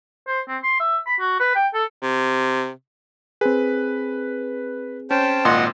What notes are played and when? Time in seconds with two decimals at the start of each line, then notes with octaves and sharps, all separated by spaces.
0.27 C5
0.48 C4
0.63 C6
0.80 E5
1.07 B5
1.20 F#4
1.40 B4
1.56 G5
1.74 A4
2.02 C3
3.41 C4 G#4 B4
5.11 C#4 C5 G5 A5
5.45 G#1 A#2 D#5 F#5 C6